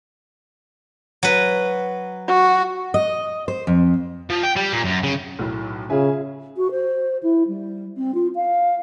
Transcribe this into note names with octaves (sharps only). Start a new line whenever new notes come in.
F#3 B4
F#4
D#5
C5
F2
F3
G5
G3
A#2
F#2
C#3
B1 A2 F#3 A4
C#3 F4 G#4 E5 G#5
F#4
C5
E4
G3
C4
F4
F5